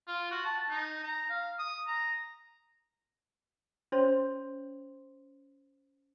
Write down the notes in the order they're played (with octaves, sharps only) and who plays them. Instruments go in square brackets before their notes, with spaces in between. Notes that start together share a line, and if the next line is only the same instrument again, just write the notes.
[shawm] F4
F#4
A5
D#4
A#5
F5
D#6
A#5
[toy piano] C#4 C5 C#5 C6